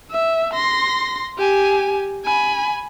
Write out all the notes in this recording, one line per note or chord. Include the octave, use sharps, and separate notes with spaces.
E5
C6 A#6
G4 G#5
G#5 B5